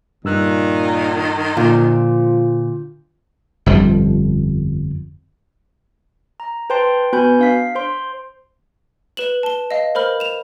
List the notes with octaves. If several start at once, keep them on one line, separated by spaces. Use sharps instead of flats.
G2 A#2 D#3 E6 F#6
A#2 D3 F3 F4 G6
G1 F2 F3 G3
A#5
B4 C5 G5 A5 C6
B3 F#4 B4 G#5 B5 G6
D4 F5 B6
C5 C6
B4 E7 F#7
A5 G7
D#5 F5
A#4 C5 B5 F6
E7 F7